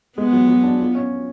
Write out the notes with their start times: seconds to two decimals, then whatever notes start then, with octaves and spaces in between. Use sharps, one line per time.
0.18 G#3 B3
0.33 F#3
0.48 F#3
0.63 D4
0.80 F4
0.95 C#4